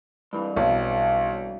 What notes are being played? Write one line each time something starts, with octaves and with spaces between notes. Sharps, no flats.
G2 E3
B1